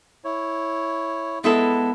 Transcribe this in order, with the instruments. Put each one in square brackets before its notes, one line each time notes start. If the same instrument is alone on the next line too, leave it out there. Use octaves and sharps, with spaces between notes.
[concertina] E4 C#5
[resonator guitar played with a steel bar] G#3 E4 A4 [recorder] B3